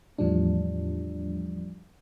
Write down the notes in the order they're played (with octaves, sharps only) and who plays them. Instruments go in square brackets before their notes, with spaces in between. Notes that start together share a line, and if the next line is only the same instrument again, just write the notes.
[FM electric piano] E2 A2 F3 G3 D4